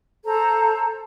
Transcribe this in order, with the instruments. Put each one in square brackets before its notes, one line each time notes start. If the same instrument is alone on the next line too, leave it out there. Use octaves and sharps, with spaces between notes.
[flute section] A4 C5 A#5